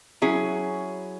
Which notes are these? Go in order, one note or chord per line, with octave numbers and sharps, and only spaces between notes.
F#3 C#4 E4 G#4